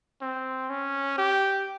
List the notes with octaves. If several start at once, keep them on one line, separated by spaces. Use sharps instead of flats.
C4
C#4
G4